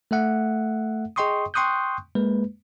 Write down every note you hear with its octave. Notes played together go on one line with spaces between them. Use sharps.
A3 A4 E5 F#5
G#4 D#5 G5 C6 C#6 D#6
G5 C6 C#6 D#6 F#6 G6
G#3 A#3 B4